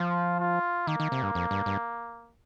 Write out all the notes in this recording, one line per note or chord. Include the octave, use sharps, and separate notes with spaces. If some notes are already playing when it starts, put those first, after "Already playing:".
Already playing: F3 F4
F4
D#3 A#3
D#3
C3
G2
F2
G2
G2